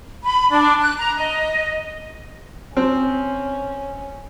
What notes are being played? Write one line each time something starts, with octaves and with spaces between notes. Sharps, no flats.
B5
D4
F#6
A#5
D#5
C4 C#4